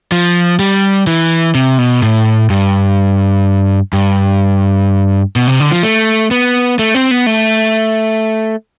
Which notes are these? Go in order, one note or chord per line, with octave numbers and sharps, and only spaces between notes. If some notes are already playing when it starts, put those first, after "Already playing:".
F3
G3
E3
C3
B2
A2
G2
G2
B2
C3
D3
F3
A3
B3
A3
C4
B3
A3